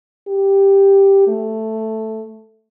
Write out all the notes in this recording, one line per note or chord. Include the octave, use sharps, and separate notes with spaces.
G4
A3